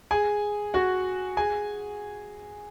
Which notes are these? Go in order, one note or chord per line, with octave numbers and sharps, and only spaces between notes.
G#4 G#5
F#4 F#5
G#4 G#5